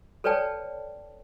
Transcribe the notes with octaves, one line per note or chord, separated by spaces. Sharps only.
A4 B4 C#5 D5 G5 A5